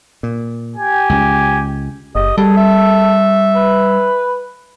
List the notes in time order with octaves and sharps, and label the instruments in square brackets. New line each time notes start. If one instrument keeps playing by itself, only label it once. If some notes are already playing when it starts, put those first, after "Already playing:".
[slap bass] A#2
[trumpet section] G4 G#5
[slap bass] C#2
[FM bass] F#1 [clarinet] G4 [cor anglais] D#5
[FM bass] G3 [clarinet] G#4 [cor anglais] A4
[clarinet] E5
[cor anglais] B4